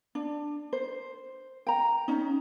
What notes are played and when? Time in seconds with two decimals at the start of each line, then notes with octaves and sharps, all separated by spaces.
0.15 D4
0.73 C5
1.67 G5 A#5
2.08 C#4 D#4